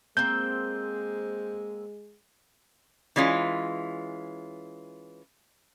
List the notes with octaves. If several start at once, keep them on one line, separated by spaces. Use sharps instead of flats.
G#3 A#3 C4 G6
E3 G#3 C#4 F4